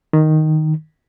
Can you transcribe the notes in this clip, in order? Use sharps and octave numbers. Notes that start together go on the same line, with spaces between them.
D#3